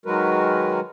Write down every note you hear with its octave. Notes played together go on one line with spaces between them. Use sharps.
D#3 F#3 G#3 F#4 A#4 B4